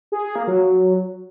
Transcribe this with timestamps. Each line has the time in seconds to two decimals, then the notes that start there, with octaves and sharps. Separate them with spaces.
0.12 G#4
0.24 G#4
0.36 A#3
0.47 F#3